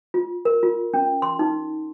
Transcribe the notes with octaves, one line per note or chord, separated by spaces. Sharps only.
F4
A#4
F4
C#4
C6
D#4